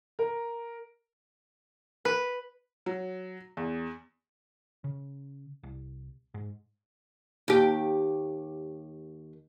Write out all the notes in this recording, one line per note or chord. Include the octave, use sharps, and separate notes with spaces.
A#4
B4
F#3
E2
C#3
C2
G#2
D#2 G4